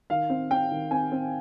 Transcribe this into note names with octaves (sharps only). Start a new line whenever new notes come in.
D#3 F5
C4
C4 G5
D#3
C4 G#5
C4